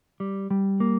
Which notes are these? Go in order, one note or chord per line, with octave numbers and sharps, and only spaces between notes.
G3
G3
A#3